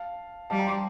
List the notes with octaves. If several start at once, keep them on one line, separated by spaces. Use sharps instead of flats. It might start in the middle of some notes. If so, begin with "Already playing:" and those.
Already playing: F5 A5
G3 F5 A5
G5 A#5
A5 C6